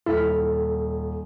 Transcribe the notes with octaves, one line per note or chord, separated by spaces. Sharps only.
D#1 E4 A4 B5 F6